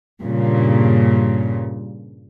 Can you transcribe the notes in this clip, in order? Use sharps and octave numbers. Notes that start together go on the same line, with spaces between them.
G2 A#2 C#3